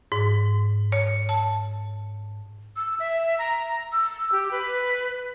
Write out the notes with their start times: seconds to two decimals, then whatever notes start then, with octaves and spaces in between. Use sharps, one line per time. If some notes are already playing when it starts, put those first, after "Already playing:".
0.12 G#2
0.92 C#5
1.29 A5
2.76 E6
3.00 E5
3.39 A#5
3.92 E6
4.32 G4
4.51 B4